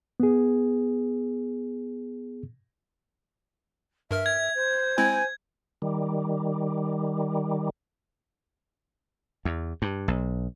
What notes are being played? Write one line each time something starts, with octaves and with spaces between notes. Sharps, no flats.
B3 G#4
G2 A#4 E5 F6
G#6
C5
G#3 C4 E4 G#5
D#3 G3
E2
G2
B1